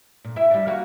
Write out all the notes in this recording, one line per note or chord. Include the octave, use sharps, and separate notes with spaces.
A#2
E4 E5
G3 D4
A#3 F4 F#4